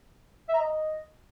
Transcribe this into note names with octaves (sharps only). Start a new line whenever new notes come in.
E5
A#5
D#5